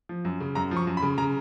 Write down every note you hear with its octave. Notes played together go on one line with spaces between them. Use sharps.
F3
F#2
C#3
F#2 A#5
F3
C#6
F#2
B5
C#3
C#3 A#5